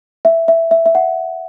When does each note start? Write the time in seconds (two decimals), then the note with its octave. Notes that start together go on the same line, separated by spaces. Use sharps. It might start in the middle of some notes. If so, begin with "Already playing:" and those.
0.25 E5
0.48 E5
0.71 E5
0.86 E5
0.95 F#5